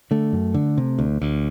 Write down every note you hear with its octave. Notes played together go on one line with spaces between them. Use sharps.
D3 A3
F#2
D3
C3
D2
D2